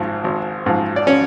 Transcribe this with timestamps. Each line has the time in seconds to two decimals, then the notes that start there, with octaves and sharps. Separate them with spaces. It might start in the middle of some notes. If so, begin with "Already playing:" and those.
Already playing: G#1 G#2 F3
0.24 G#1
0.66 G#2 F3
0.96 D5
1.07 C#4 C#5